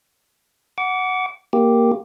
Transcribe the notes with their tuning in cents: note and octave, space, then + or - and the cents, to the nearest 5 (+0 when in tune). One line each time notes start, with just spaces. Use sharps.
F#5 +0 D6 -30
A#3 +0 G4 +0